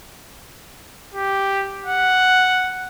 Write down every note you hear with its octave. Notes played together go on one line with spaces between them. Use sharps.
G4
F#5